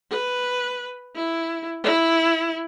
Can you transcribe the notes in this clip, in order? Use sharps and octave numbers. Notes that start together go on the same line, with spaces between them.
B4
E4
E4